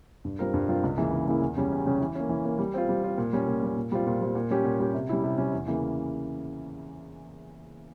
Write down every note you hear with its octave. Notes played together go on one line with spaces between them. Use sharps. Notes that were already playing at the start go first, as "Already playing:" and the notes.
G2
G3 C4 F4 A#4
G2
G3 C4 F4 A#4
C#2
C#3 E3 A#3 E4
C#2
C#3 E3 A#3 E4
E2
C#3 G3 C#4 G4
E2
C#3 G3 C#4 G4
E3
A#3 C#4
E3
A#3 C#4
G3
C4 F4
G3
C4 F4
A#2
G3 C#4
A#2
G3 C#4
A#2
G3 C4 F4
A#2
G3 C4 F4
A#2
G3 C#4 G4
A#2
G3 C#4 G4
C3
G3 C#4 E4
C3
G3 C#4 E4
E2
C#3 E3 A#3